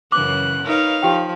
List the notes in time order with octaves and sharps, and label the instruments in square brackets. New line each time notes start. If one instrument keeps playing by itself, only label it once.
[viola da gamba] F#2 C#3 E3 [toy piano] D6 [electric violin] F#6
[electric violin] D#4 F5 [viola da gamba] A#4 B4 C#5
[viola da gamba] F3 [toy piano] G4 G5